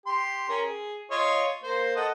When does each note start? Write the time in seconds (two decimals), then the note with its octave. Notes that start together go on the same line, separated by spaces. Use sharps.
0.06 G4 C6
0.49 C#4 A#4 A#5
0.63 G#4
1.11 F4 C#5 D#5
1.63 A#3 C5
1.96 A4 D#5 F#5